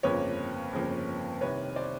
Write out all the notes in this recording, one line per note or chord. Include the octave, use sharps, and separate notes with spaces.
G1 F2 C#3 F3 A#3 B4 C#5
G1 F2 C#3 F3 A#3
C2 C3 D#3 B4 C#5
C5 D5